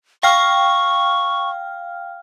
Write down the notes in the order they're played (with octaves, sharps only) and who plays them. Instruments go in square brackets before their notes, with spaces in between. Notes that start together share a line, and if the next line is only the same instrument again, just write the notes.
[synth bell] F5 G5 F6 [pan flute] C#6